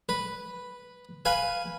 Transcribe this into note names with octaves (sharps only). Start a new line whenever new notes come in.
B4
B4 F5 G#5